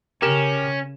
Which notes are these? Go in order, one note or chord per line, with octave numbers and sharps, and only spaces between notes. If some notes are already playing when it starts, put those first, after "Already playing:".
C#3 C#4 G4 A#4 E7